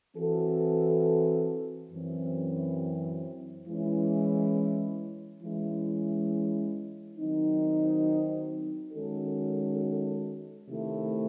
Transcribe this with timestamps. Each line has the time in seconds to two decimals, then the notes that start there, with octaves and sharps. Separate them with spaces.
0.16 E3 C4 F#4 A4
1.92 F#2 E3 C4
3.67 E3 G#3 C#4 E4
5.42 E3 G#3 C#4 E4
7.17 D#3 F#3 C4 D#4
8.93 D#3 G#3 C#4 F#4 A4
10.69 C3 D#3 A3 C4 E4